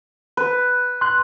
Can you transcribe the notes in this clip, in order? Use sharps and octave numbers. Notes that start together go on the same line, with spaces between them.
B4
C6 F#6